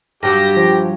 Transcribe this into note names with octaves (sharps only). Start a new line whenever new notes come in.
G2 F#3 G4 A#6
F3